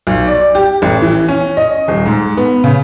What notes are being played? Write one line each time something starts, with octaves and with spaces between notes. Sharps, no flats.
B1
D5
G4
A1
E3
C#4
D#5
D#1
G#2
B3
C#3